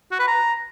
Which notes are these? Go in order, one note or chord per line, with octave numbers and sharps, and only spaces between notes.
F#4
B4
A#5